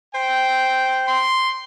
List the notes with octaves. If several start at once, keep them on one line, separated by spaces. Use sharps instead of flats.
C5 G5
C6